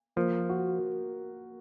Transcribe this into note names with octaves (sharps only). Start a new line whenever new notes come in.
F3 A#3
F#4